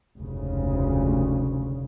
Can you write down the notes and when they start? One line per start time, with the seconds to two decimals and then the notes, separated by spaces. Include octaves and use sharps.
0.18 F1 D2 G#2 C#3